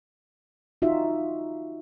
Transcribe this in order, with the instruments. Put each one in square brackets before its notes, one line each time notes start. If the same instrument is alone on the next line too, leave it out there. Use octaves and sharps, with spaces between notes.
[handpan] D#4 F4 F#4 E5